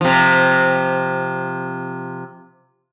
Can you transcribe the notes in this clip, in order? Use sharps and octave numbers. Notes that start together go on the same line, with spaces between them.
C3 F3